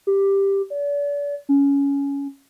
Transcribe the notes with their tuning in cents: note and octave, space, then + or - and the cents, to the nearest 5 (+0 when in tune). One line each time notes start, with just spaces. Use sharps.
G4 +5
D5 -40
C#4 +15